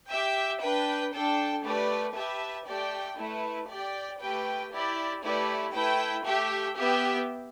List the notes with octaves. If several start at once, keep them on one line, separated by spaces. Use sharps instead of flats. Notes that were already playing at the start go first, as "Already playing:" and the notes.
G4 E5 G5
D4 B4 G5
D4 A4 G5
A3 G4 B4 D5
G4 B4 E5 A5
A3 G4 D5 G5
A3 E4 B4
G4 D5 G5
A3 G4 B4 G5
E4 G4 D5
A3 E4 G4 B4 D5
A3 E4 B4 G5
A3 G4 E5 G5
B3 G4 E5 G5